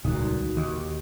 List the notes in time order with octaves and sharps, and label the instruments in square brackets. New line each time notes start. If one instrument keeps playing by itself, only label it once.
[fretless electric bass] D#1 C#2 A#2 [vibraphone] D#4 F#4
[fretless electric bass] D#2